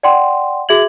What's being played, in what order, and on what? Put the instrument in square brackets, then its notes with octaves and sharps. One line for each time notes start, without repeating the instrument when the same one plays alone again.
[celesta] D5 F#5 G5 C6
F#4 G#4 E5 G#6 F#7